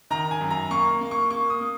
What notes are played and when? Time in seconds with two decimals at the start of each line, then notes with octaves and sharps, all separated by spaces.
0.11 D#3 A#5
0.31 G#5
0.41 F#2
0.50 A#5
0.70 A#3 C#6
1.01 A#3
1.11 C#6
1.30 A#3 C#6
1.50 D#6
1.61 A#3